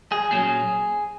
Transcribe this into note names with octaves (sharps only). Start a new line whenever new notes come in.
G#4
A#2 F#3 C#4 G#4